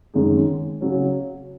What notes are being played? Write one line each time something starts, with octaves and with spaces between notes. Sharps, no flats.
F#2 D#3 G#3 D#4 G#4
C#3 F#3 C#4